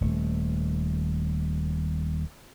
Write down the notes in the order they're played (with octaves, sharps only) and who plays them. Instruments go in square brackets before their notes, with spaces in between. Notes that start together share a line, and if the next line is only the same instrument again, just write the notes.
[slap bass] D#1 A3